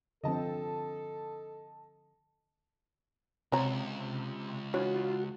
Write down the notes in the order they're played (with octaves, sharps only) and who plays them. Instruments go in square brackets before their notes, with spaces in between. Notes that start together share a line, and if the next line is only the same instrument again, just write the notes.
[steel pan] D3 F3 C4 [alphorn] A4 [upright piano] D#5 A5
[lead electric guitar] C#2 [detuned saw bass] C3 [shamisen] C4 C#5 A#5
[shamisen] E3 D4 C#5 [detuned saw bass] F4 [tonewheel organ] F#4